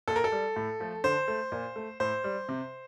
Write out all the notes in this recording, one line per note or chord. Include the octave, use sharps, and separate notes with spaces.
A#2 A4
A#4
A4
G3
A2
F3 A3
D3 C5
A3
A#2
A3
A2 C5
G3
C3